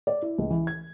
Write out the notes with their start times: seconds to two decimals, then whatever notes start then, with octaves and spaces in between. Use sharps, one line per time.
0.07 D5
0.22 E4
0.38 C#2
0.50 E3
0.67 G#6